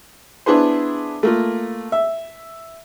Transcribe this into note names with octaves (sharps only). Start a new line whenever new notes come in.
B3 D4 E4 G#4 B4 C5
A3 A#3 F4
E5